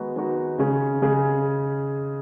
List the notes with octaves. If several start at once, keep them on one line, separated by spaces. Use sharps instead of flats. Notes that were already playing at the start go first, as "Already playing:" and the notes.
Already playing: D#3 G#3 B3 D#4 F#4
D#3 G#3 B3 D#4 F#4
C#3 G#3 C#4 G#4
C#3 G#3 C#4 G#4